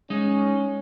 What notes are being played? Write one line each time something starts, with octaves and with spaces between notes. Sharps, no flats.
G#3 C#4 D#4